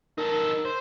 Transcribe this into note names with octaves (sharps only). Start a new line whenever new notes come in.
D#4 A4 A#4
C5